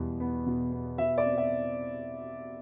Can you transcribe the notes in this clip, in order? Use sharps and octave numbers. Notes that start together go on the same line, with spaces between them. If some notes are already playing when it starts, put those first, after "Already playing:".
Already playing: E2 B2 G3
B3
B2
B3
B2 E5
D5
C4
E5